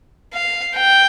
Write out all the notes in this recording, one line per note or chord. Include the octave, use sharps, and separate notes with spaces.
F5
G5